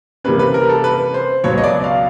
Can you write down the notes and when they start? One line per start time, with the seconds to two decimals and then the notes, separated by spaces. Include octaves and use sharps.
0.24 C3 E3 G3 A#3 C#4 B4
0.39 B4
0.54 A#4
0.69 A4
0.84 B4
1.14 C5
1.44 C#2 B2 F#3 B3 C#5
1.58 D#5
1.64 D5
1.84 F5